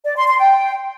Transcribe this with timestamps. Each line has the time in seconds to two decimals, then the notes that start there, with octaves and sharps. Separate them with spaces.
0.05 D5
0.16 C6
0.27 C6
0.38 G5